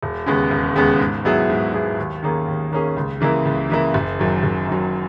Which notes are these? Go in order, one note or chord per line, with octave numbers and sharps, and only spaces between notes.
E1
D#2 C#3 G#3 B3
E1
D#2 C#3 G#3 B3
G#2
F#3 B3 E4 G#4
G#2
F#3 B3 E4 G#4
D#2
D#3 A#3 C#4 G#4
D#2
D#3 A#3 C#4 G#4
C#2
C#3 E3 A#3 E4
C#2
C#3 E3 A#3 E4
F#1
F#2 D#3 F#3
F#1
F#2 D#3 F#3